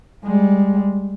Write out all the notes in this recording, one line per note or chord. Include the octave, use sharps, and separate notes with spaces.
G3 G#3